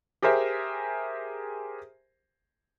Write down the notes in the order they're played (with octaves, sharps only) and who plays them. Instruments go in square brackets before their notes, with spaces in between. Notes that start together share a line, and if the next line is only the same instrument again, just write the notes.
[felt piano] G4 G#4 A#4 C5 E5